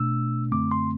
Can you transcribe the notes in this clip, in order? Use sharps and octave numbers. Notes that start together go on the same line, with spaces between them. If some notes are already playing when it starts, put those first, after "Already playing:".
Already playing: B2 A3 D4 E6
F#2 D3 A3 C4 D6
C6